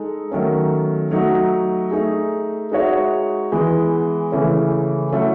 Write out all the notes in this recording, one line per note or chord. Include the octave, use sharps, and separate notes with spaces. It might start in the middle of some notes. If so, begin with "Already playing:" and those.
Already playing: G#3 D#4 A4
D#3 F#3 A3 C#4
F#3 A3 D#4 F#4 A4
A3 D#4 G#4
G#3 D#4 F#4 C#5 E5
E3 G#3 B3
C#3 E3 A3 C#4
F#3 A3 C#4 E4 A4